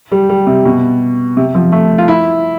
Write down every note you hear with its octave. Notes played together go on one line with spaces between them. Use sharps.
G3
G3
C3
B2
C3
F3
A3
F4
E4